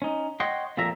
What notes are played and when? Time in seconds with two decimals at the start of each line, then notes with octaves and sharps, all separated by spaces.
0.02 C#4 D#4
0.40 C#5 D#5 F#5 G5 C6
0.77 F2 A#2 F3 E5 A#5